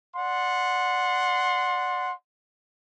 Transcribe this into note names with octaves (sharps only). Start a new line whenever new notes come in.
D5 F#5 C6